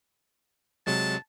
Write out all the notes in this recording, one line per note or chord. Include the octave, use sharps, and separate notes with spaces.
C3 F#3 G#3 A5